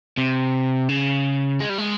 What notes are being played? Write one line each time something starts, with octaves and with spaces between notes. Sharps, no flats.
C3
C#3
G#3
G3
G#3